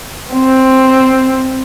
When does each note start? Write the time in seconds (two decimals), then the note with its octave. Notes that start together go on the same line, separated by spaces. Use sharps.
0.33 C4